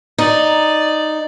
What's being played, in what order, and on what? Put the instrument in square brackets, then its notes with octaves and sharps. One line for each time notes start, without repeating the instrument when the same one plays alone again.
[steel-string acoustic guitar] D#4 [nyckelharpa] D5